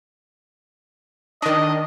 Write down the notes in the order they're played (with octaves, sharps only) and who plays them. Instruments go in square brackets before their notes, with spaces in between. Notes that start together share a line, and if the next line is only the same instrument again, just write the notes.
[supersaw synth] D#3 D4 [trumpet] D#5